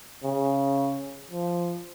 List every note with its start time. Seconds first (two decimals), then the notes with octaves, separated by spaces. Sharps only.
0.23 C#3
1.31 F3